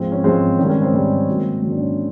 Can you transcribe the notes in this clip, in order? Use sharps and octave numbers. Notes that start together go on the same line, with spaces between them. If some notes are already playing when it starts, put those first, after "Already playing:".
Already playing: G#2 F3 G#3 C4
C#4
G#2 F3 G#3 C4
G#2 D#3 G3 C#4
C#4
C4
G#2 D#3 G3
G#2 D#3 F#3 A#3
G#2 D#3 F#3 A#3 C#4
D4
C#4